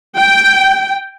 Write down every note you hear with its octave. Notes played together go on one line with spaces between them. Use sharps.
G5